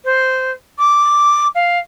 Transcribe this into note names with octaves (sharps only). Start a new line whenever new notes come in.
C5
D6
F5